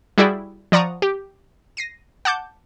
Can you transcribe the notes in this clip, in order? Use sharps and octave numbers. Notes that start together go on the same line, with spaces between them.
G3 E4 F#4 G#4 D5 G5
F3 D5 F#5 A#5 C#6 D#6
G4
A#6 C7 D#7
F#5 A5 D6 G6